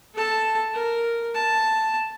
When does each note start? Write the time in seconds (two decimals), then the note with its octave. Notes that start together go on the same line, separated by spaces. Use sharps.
0.15 A4 A5
0.74 A#4
1.35 A5